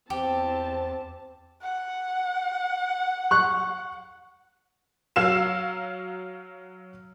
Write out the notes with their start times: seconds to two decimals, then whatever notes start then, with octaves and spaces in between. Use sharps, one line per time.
0.10 E2 C4 G4 C5 A5
1.63 F#5
3.31 C#6 F#6
5.16 F#3 F5 E6 E7